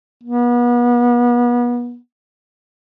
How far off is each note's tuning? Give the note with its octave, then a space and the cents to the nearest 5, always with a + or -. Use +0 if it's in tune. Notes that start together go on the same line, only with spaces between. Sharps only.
B3 -35